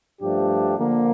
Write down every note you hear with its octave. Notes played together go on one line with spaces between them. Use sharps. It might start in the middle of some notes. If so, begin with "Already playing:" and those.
G2 F3 A3 D4 G4
D3 F3 A#3